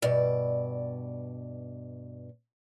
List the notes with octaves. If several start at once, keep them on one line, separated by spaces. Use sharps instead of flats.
G2 B2 D5